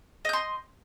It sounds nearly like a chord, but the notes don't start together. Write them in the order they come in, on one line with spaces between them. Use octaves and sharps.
D#5 G6 C6